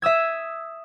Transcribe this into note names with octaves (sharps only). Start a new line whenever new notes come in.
E5 D#6 E6 G#6